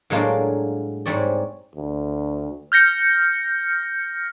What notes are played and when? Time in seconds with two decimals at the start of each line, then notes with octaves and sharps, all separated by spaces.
0.10 A2 F#3 G#3 A#3 D4 F4
1.06 G#2 G3 C4 C#5 D5
1.76 D2
2.72 F6 G6 A#6 C#7